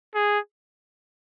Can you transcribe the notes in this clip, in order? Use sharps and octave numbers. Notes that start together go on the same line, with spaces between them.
G#4